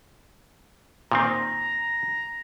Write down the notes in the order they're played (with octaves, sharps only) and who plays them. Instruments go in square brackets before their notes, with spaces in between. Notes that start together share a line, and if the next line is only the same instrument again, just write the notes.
[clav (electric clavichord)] A#2 D#3 C4 [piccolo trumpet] A#5